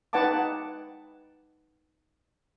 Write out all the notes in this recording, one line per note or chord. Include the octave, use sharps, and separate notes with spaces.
D#4 B4 F#5 G5 A5 D6